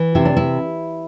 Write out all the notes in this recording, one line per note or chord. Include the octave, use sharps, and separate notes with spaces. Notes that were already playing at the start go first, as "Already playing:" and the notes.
Already playing: E3
C3 E4
D4
E4